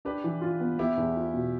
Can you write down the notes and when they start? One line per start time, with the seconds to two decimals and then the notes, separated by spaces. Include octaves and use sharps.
0.05 D4 G4 B4
0.24 E3
0.41 F4
0.60 B3
0.78 B3 E4 G4
0.97 E2
1.16 F4
1.34 B2